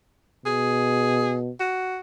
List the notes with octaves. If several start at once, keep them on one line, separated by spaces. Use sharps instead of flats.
B2 G#4
F#4